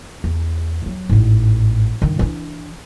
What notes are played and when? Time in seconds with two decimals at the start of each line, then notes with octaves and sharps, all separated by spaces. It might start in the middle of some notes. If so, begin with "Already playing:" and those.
0.24 E2
0.86 F#3
1.10 A1 G#2
2.02 G2 D#3
2.19 E3 D4